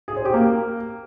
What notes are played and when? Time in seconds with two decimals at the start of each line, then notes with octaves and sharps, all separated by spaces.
0.08 G#4
0.17 C5
0.25 G4
0.34 A#3